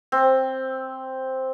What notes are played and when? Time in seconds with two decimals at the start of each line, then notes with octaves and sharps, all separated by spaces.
0.12 C4